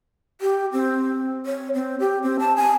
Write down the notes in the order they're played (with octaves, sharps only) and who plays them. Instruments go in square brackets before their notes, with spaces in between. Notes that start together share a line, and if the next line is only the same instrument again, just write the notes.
[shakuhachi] G4
C4
C#5
C4
G4
C4
A5
G#5